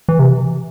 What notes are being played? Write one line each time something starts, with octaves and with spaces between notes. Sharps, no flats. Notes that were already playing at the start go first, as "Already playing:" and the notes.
E3
C3